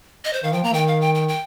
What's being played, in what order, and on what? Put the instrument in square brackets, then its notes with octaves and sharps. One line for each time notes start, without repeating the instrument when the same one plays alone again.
[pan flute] D#5
C5
[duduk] D#3 [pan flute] F5
[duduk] F3 [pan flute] G5
[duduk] A#3 [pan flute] A#5
[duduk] D#3 [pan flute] G5
[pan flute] F5
G5
G5
G5